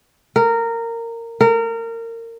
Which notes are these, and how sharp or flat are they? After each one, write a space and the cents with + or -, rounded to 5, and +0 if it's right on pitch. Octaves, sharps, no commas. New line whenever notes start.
A#4 -15
A#4 -25